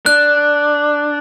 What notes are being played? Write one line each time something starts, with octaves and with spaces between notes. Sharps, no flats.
D4 F#6